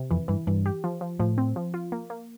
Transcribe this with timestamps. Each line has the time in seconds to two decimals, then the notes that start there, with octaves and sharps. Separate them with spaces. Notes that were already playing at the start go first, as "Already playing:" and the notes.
Already playing: C3
0.11 F2 E3
0.28 G2 E3
0.47 G2 E3
0.66 G4
0.84 F3
1.01 F3
1.19 A2 F3
1.38 C4
1.56 F3
1.74 F4
1.92 A#3
2.10 A#3